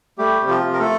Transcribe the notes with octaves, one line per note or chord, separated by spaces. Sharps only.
G3 A3 G4
C3
F3 F4
C3
A#4
A3 A4